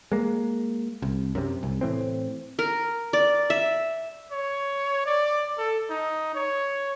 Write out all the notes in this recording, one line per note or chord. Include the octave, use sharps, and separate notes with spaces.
G#3 A#3
C2
F#2 C3
C2
A2 E3 C4
A#4
D5
E5
C#5
D5
A4
D#4
C#5